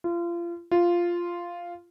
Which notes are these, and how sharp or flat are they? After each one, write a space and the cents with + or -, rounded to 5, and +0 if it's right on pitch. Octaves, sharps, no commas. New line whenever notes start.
F4 -30
F4 -5